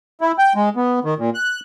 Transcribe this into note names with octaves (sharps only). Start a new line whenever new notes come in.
E4
G5
G#3
B3
D#3
A#2
F#6